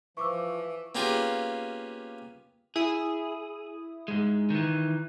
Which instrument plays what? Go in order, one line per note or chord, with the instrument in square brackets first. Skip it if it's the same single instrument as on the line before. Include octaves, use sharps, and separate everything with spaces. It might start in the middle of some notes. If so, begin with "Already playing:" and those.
[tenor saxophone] E3 [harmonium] F3 [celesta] C#6 D6 E6
[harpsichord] A#3 B3 C#4 F4 G4 G#4
[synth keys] E4 D#6 [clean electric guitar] G#4
[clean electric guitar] G#2 G#3
D#3 E3